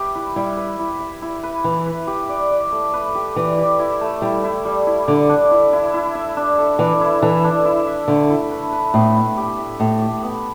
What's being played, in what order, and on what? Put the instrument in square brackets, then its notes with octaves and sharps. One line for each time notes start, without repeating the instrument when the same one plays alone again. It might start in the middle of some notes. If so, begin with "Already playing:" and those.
Already playing: [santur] G4 B4 E5
E4
[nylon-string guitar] G3 [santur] E4
[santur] B4
E4
E5
E4
B4
[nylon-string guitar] E3 [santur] E4
[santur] B4
G4
D5
D5
A3
B4
G4
[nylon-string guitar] E3 [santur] D5
[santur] G4
E4
A3
[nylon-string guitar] G3 [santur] E4
[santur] E4
G3
E4
[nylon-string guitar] D3 [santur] D5
[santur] D4
E4
E4
E4
E5
D4
A4
[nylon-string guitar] E3 [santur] D5
[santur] E4
[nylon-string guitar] E3 [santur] A4
[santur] D4
E4
E5
[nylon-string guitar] D3 [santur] A3
[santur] E4
B4
B4
[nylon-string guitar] A2 [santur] B3
[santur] E4
G4
E5
[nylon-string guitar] A2 [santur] A3
[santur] G4
B3